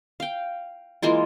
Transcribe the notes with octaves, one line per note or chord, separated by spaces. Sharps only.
F5 G5
E3 G#3 A#3 F4